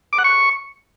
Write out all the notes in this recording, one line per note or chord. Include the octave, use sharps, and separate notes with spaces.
D6
F#5
C#6